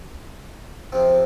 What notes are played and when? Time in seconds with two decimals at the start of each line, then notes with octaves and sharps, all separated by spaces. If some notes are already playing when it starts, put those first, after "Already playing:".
0.92 F2 C3 F3 C4